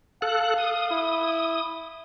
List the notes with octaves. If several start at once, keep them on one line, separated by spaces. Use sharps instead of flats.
A4 F5 F#6
D#6
E4